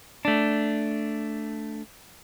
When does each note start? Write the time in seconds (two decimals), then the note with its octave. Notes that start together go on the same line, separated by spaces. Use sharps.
0.25 A3 D4